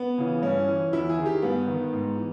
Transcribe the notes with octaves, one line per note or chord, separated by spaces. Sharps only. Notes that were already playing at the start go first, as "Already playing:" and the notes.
Already playing: B3
C#3 E3
G2 C#4
E3
E2 E4
G#4
D#3
G4
G2 B3
D#3
G#2
E3